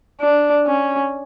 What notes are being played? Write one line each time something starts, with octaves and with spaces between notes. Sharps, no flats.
D4
C#4